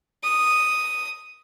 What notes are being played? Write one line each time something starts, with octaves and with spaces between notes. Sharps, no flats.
D#6